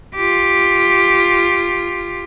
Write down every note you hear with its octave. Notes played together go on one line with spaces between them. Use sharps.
F4 G4